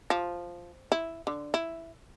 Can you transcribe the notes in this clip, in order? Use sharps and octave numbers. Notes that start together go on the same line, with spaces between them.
F3
E4
D3
E4